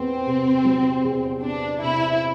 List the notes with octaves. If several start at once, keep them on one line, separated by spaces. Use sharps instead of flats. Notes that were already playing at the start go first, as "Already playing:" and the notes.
Already playing: E2 B3 C4
C3
F#3
E2
B3 D4
C3 E4